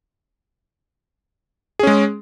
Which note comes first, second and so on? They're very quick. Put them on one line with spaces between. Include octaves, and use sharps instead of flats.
G#4 C#4 G#3